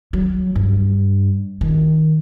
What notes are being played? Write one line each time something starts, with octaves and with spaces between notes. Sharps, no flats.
F#3
G2
D#3